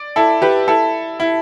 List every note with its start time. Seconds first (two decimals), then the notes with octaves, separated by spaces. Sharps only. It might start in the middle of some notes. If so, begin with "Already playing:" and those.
Already playing: D5
0.16 E4 A4
0.42 G4 B4
0.68 E4 A4
1.20 E4